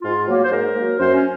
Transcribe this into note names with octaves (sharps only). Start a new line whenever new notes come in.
G#2 F4
F#3 A#3
C5
G#2 A#4
F#3 A#3
F#2 C5
C#4